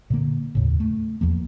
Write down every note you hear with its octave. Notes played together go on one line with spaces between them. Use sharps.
A#2 D3 A#3
D#2 A2 C#3
A3
E2 F3 A#3